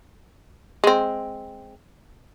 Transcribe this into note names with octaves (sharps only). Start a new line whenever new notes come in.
G#3 C4